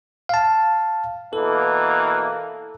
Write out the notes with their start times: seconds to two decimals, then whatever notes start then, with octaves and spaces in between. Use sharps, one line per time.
0.29 F5 A5
1.33 B2 E3 A#3 A4